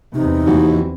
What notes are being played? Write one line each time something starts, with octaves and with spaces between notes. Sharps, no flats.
E2 C3 D#4
D#2 E3 F#4